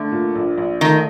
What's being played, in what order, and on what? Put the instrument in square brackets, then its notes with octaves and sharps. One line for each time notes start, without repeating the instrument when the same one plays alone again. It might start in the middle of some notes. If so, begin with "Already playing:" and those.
Already playing: [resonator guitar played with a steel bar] D3 [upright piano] A3
[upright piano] A#2
A#1
A#1
[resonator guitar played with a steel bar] D#3 [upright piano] A3